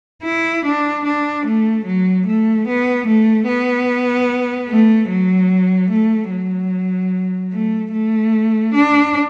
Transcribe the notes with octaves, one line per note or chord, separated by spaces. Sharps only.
E4
D4
D4
A3
F#3
A3
B3
A3
B3
A3
F#3
A3
F#3
A3
A3
D4